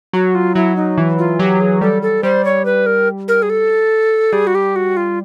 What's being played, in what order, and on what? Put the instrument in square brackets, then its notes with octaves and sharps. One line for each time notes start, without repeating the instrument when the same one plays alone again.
[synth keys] F#3 [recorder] F#4
[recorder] F4
[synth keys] F#3 [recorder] E4
[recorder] D#4
[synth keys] E3
[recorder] F4
[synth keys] F#3 [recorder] G4
[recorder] G#4
[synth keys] G3 [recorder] A4
[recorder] A4
[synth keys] G3 [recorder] C5
[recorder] C#5
B4
A#4
A#4
G#4
A4
[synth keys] G3 [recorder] G#4
[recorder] F#4
G4
F#4
F4